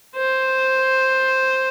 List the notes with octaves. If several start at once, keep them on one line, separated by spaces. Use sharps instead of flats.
C5